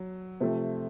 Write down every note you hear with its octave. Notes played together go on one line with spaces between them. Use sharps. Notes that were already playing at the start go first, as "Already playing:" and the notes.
Already playing: F#3
C3 F3 A3